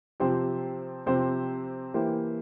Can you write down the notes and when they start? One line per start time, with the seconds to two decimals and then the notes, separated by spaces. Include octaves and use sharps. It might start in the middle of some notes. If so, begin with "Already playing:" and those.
0.20 C3 F3 C4 G4 C5
1.06 C3 F3 C4 G4 C5
1.94 E3 A#3 E4 G4 C5